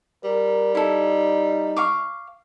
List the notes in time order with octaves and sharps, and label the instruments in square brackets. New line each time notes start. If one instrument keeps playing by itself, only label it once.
[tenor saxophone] G3 [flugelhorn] A#4
[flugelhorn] D#4 [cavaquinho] E4 A4
[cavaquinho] F5 C#6 D6